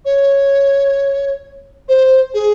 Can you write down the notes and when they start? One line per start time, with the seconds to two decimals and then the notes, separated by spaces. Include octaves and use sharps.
0.05 C#5
1.89 C5
2.34 G#4